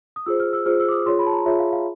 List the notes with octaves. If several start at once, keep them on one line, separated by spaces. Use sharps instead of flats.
D#6
F4 G#4 C5 E6
F6
E6
F4 G#4 C5 F6
E6
D6
D#6
F4 G#4 C#5 C6
B5
A5
A#5
F4 G#4 C#5 E5
F5
F5